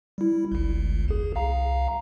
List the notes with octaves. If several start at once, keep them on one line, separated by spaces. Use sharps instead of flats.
G3 E4
G1 C#2
E2 G#4
C2 F5 A#5